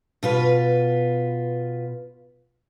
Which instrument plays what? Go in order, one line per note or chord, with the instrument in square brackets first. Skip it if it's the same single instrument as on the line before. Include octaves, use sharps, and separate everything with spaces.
[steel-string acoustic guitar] B2 F4 B4